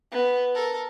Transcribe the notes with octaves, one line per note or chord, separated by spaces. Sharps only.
B3
A4 A#4